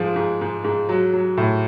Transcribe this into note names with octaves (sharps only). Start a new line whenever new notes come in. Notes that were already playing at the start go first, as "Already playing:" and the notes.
Already playing: G#2 F3 G#3
G#2
G#2
G#2
F#3
F#3
A2